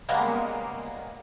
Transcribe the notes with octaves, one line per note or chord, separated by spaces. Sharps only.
C#3 G3 G#3 A#3 B3